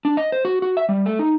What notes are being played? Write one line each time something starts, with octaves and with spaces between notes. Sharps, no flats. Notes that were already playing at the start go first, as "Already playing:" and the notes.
D4
D#5
C5
F#4
F#4
E5
G3
A3
D#4